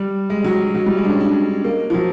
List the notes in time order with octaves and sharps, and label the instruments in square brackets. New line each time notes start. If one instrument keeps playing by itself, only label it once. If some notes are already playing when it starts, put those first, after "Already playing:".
Already playing: [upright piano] G3
G#3
F#3
F#3
G3
G#3
D4
C#4
D4
A#3
F3
F#3